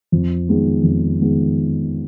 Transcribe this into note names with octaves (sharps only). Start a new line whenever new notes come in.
F2
D#3 G#3 B3
F2
D#3 G#3 B3